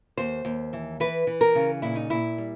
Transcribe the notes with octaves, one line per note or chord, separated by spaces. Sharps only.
D#2 C5
D#2
E3
E3 B4
E3
A#4
C#3
A#2 E4
D#4
A#2 E4
G3